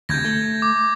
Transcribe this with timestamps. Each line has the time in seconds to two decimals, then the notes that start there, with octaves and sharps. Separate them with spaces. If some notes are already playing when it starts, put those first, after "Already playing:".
0.09 D2 C3 G6 G#6 A#6
0.24 A3
0.62 D6